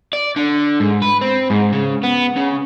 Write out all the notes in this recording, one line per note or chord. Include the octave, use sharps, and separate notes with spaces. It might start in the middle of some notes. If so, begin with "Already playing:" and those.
D5
D3
G#2
B4
C4
G#2
C#3
B3
C#3